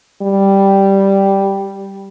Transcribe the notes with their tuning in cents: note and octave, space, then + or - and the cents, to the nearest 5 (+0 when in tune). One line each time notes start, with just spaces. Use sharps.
G3 +0